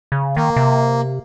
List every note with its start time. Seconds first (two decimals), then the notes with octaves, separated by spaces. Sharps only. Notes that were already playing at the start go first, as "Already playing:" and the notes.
0.12 C#3
0.37 D#3 A#3
0.56 C3